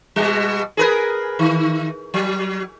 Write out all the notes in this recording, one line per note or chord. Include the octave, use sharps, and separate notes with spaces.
B2 G3
G#4 A#4 B4
D#3
F#3